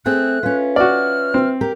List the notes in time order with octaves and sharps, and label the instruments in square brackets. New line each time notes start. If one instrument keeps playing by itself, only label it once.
[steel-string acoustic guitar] A3 C4 G#4 [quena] F#6
[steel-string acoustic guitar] C#4 F4 [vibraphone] B4 E5
[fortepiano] F#4 D5 [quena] F6
[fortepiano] C4
[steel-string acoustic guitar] G4 A#4